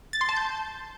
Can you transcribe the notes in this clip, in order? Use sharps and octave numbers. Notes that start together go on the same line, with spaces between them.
A6
C6
A5
G6